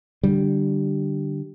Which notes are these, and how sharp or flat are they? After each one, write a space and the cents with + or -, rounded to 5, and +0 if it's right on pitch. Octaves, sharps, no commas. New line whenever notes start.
D3 +10 G3 -10